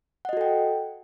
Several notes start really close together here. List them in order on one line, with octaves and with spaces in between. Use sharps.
F#5 D#5 F#4 A4 G5